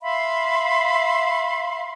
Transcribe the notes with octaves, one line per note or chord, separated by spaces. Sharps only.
E5 F5 B5 C6